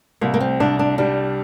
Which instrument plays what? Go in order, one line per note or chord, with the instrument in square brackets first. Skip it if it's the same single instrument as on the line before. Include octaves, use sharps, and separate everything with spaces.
[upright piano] C2 [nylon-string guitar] A#3
[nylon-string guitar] A#3
C4
[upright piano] C2 [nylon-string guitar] D4
[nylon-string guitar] D4
[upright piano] G3 [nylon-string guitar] D4